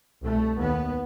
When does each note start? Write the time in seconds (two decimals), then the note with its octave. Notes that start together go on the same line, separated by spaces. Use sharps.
0.22 C2 B2 A3
0.59 D#2 B3